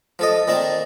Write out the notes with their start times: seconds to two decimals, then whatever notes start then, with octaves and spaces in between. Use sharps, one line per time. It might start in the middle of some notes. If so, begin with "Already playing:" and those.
0.19 F3 A4 D#5
0.48 A#2 D#3 C4 A5